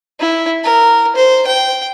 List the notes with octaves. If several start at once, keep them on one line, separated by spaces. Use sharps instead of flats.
E4
A#4
C5
G5